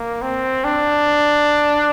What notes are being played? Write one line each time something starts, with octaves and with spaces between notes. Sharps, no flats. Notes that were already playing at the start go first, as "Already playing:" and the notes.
Already playing: A#3
C4
D4